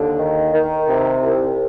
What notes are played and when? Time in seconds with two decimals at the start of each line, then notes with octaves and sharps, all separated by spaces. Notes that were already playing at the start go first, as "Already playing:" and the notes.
Already playing: D#2 D3
0.18 D#3
0.53 D#3
0.87 C3
1.22 C2